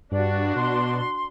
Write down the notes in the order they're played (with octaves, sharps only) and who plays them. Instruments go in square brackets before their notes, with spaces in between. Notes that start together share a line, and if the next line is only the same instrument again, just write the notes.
[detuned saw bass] G2 [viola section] D4 F#4 [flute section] D5
[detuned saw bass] B2 [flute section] C6